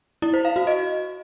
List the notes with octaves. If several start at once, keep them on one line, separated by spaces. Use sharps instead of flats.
E4
C5
F5
F#4
D#5